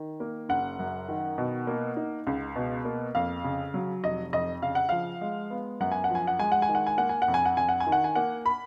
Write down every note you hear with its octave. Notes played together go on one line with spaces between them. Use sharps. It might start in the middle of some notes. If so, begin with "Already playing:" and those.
Already playing: D#3
A#3
F#1 F#5
F#2
D#3
B2
A#3
D#4
C#2
B2
A#3
F2 F5
C#3
F#3
F1 D#5
F2 D#5
C#3 F5
F#5
F3 F5
G#3
B3
F#2 F#5
G#5
F#5
F3
G#5
F#5
G#3 G#5
F#5
G#5
D#3
F#5
G#5
A#3 F#5
G#5
F#5
F2
G#5
F#5
F2 G#5
F#5
G#5
D#3
F#5
G#5
A#3 F#5
B5